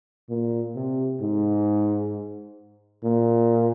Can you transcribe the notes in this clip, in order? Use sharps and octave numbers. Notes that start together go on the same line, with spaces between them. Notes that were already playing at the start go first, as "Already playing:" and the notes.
A#2
C3
G#2
A#2